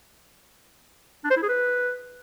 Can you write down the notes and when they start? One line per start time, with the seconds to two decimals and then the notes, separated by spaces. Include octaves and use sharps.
1.25 D4
1.31 C5
1.37 E4
1.43 G#4
1.49 B4